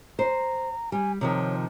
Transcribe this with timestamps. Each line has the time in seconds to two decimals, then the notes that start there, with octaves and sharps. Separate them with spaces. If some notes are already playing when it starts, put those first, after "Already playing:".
0.19 C5 A#5
0.92 G3 G#5
1.21 C3 D#3 F3 C#5